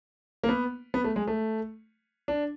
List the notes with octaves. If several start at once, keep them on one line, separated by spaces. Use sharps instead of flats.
A#3
B3
B3
A3
G#3
A3
D4